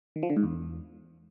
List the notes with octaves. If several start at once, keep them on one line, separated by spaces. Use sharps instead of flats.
D#3
F3
D3
G#2
E2